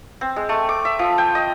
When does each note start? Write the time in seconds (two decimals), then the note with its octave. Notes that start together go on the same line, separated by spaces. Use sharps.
0.21 C4
0.36 G#3
0.49 A3
0.69 D6
0.85 E5
0.99 F3
1.18 G5
1.35 D#5